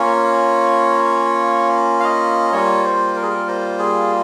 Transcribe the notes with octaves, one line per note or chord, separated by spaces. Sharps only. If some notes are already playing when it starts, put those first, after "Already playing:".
Already playing: A#3 C#4 F4 C#5
F5
D#5
G3 A#3 F4 C#5
C5
A#4
G#4
A#4
C5
G#4